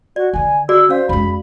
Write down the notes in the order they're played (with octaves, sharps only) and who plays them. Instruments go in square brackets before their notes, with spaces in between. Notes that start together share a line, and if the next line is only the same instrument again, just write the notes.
[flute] F#4 [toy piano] D5
[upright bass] D3 D#3 [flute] G#5
[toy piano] F#4 G#4 D5 [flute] E6
[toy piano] C#4 F5 [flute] C5
[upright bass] F2 G#3 [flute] B5